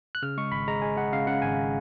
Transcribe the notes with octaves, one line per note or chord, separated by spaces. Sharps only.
F#6
C#3 F6
G#3 C#6
G#1 B5
G#3 A#5
G#3 G#5
G#3 F#5
C#3 F5
C#3 F#5
G#1 G#5